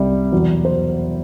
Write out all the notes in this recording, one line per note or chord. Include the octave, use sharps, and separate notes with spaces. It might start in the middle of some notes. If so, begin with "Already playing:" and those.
Already playing: C2 C3 G3 D5 E5
E2 B2 F#3 B3
C5